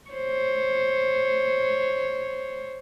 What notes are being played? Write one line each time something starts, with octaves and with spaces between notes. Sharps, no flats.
C5 C#5